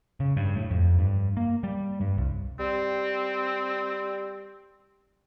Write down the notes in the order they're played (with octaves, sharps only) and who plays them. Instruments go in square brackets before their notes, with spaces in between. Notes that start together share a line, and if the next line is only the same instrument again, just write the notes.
[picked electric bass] C#3
G2
A2
F2
G2
A#3
G3
G2
C2
[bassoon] G3 [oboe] C4